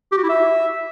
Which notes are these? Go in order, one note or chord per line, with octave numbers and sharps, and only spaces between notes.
G4
F#4
E4
E5